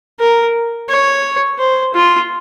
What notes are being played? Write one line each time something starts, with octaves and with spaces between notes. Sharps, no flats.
A#4
C#5
C5
F4